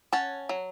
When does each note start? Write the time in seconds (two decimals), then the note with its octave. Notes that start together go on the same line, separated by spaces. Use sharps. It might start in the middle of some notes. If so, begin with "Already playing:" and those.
0.13 C#4 F#5 A5
0.49 F#3